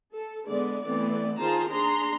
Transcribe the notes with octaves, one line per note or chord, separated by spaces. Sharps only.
A4
D3 G#3 B3 D5
E3 A3 B3 C4 D5
D#3 F4 G#4 C5 A5 A#5
D4 G#4 A#5 C6